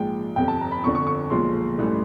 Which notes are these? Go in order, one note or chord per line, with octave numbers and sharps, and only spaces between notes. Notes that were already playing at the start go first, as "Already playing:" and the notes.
Already playing: A#1 G#2 F3 G#3 G5
G1 F2 C3 G5
A5
A#5
B5
G1 F2 D3 C#6
C#6
C#6
B1 A#2 F3 G#3 C6
A1 G2 E3 A3